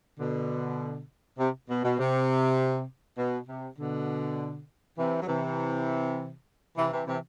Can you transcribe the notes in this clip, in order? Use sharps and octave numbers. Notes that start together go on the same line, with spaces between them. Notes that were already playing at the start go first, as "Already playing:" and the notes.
B2 D3
C3
B2
B2
C3
B2
C3
B2 D3
C3 E3
F#3
C3 E3
C3 E3
C3 E3
C3 E3